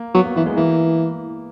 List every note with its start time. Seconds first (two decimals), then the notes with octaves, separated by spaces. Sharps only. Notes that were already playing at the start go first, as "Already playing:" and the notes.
Already playing: A#3
0.14 F#3 B3
0.25 A#3
0.36 E3 B3
0.46 G#3
0.56 E3 A#3